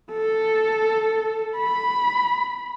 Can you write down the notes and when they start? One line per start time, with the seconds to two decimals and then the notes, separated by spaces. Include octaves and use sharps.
0.13 A4
1.56 B5